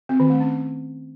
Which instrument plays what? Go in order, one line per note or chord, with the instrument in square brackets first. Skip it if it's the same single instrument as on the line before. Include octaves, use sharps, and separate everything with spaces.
[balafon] C4
D#3
A3
C#4